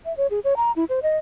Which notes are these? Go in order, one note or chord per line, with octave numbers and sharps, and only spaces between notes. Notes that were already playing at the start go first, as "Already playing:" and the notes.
E5
C#5
G#4
C#5
A#5
E4
C5
D#5